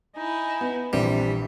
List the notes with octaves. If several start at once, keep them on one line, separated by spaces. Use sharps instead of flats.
D#4 E4 G#5
B3
A#1 C3 E3 G3